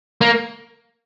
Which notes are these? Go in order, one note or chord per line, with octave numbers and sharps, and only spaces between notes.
A#3